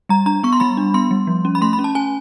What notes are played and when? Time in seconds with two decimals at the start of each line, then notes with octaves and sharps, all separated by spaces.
0.09 G3 A#5
0.26 D4 A#5
0.43 B3 C#6
0.53 C6
0.60 G3 B5
0.77 D4
0.94 B3 C6
1.11 G3
1.27 F3
1.45 C#4
1.55 B5
1.61 A3 C6
1.73 B5
1.79 C#4
1.84 A5
1.95 C#4 G#5